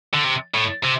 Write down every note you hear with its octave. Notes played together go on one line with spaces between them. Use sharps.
D3
C3
A2
C3